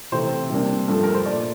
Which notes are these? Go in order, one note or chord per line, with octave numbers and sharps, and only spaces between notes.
C3 E3 A3 C4 C5
C3 G3 A#3 D4
G2 F3 A3 A4
A#4
C5
A#2 A3 D5